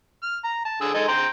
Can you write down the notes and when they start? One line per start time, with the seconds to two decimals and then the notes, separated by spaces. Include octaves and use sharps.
0.23 F6
0.44 A#5
0.65 A5
0.81 D3 G#4 E6
0.94 G#3 D#4 A4
1.08 G5 A#5 C6